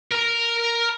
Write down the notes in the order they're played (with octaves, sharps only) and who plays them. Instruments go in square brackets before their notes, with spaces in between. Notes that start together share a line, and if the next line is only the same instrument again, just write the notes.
[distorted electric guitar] A#4 A#5